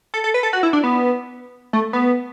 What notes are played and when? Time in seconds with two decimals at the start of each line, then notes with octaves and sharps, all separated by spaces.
0.14 A4
0.24 A4
0.34 B4
0.43 A4
0.53 F#4
0.63 E4
0.73 D4
0.83 B3
1.73 A3
1.93 B3